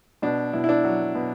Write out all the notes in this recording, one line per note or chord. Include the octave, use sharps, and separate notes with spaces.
B2 D4
B2 E4
E4
D4
F#3
B2